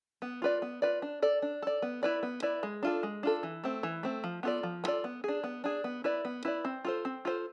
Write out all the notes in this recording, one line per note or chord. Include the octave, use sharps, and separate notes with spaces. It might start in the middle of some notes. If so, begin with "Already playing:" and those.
B3
F4 B4 D5
B3
F4 B4 D5
D4
A4 D5
D4
A4 D5
B3
E4 B4 D5
B3
E4 B4 D5
G#3
D4 F4 A4
G#3
D4 F4 A4
E3
A3 C4
E3
A3 C4
F3
B3 F4 A4 D5
F3
B3 F4 A4 D5
B3
D4 G#4
B3
D4 G#4
B3
E4 B4 D5
B3
E4 B4 D5
C4
F4 A4 C5
C4
F4 A4 C5